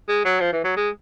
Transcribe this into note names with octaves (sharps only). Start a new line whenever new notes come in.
G#3
F#3
F3
E3
F#3
G#3